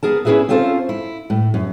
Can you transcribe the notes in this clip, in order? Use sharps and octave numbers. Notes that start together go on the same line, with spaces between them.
B3 G#4 A#4 A5
C#4 E4 F#4 G#4 B4 E5
C4 C#4 F4 A4 C5
E4
A2
F#2